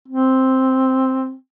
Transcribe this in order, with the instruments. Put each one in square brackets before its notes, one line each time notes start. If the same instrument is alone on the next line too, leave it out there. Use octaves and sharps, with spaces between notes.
[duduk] C4